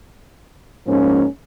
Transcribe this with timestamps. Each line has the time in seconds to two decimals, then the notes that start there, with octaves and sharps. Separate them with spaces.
0.87 G#2 F3 A#3 C#4